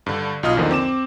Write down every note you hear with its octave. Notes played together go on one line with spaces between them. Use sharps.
G2 D3
B1 F4 D#5 D#6 F6
E2 D3 D#3 F3 A#3 D#4
C4 D6 E7